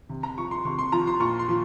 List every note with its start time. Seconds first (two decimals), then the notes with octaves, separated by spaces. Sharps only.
0.09 C3
0.23 A#5
0.38 F3 C#6
0.51 C6
0.65 C3 C#6
0.79 C6
0.92 F3 A#5
1.07 C6
1.20 A#2 C#6
1.39 C6
1.49 F3